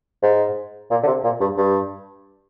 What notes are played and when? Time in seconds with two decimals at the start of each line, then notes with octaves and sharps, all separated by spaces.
0.22 G#2
0.91 A#2
1.03 D3
1.07 C3
1.24 A#2
1.40 G2
1.57 G2